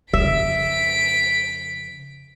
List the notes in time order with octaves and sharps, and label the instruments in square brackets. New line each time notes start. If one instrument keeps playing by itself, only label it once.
[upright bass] F2 C#3 [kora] E5 [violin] B6 D7